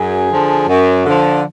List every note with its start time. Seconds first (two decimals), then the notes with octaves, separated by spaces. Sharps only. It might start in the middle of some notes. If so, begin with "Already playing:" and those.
Already playing: F#2 G#4
0.30 D3 F3
0.68 F#2
1.05 D3 F3